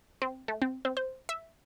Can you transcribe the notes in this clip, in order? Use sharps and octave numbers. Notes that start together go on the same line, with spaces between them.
C4
A3
C4
C4
C5
E5